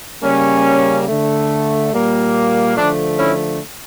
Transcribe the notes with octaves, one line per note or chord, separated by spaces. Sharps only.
C#3 G3 A#3 C#4
D3 A3
A#2 G3 A#3
D3 F3 A3 D4
C#4 E4